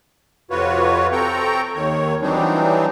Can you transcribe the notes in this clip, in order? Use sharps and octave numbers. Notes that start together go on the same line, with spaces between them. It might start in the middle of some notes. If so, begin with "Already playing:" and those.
F2 C3 F4 F#4 B4 C#5
C4 A4 G5 A#5 C#6
D#2 D#3 C#5
E3 F#3 G3 C4 D4 D#4